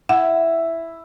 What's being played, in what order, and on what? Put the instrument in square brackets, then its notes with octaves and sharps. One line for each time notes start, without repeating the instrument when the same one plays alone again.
[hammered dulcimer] E4 [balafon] F#5